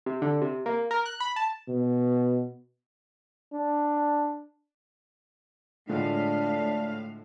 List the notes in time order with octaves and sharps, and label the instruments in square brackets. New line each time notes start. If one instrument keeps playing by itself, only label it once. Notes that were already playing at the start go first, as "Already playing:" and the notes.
[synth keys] C3
D3
C3
A#3
A#4
F#6
B5
A5
[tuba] B2
[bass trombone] D4
[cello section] A2 F5 [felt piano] D3 F3 G#3 [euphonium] D4